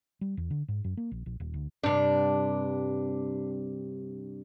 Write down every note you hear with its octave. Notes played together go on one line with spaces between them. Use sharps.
G3
E2
D3
G#2
F#2
A#3
A#1
A#1
D#1
D2
G2 C3 D4